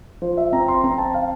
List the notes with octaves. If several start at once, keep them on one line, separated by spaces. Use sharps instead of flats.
F3 C5
E5
C4 A#5
C6
C4 A#5
A5
F5